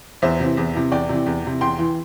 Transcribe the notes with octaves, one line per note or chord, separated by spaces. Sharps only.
E2 C5 E5
C3 E3
E2
C3 E3
E2 D5 G5
C3 E3
E2
C3 E3
E2 G5 C6
E3